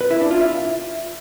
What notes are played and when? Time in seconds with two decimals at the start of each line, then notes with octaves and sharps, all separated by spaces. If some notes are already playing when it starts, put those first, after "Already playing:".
0.01 B4
0.11 E4
0.21 D4
0.31 F4
0.41 E5